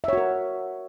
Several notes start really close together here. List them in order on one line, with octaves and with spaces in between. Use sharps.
E5 C#5 F#4 A#4